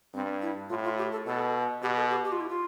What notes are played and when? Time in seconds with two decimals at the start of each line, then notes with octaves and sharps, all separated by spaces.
0.14 G2 C4
0.42 E4
0.70 A2 F4
0.84 F4
0.98 G4
1.12 A4
1.26 B2 A4
1.82 B2 G4
1.97 A4
2.11 G4
2.25 G4
2.32 F4
2.40 E4
2.49 F4